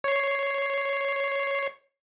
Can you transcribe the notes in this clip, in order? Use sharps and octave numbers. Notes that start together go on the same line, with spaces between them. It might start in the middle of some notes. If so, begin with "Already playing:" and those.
C#5 C7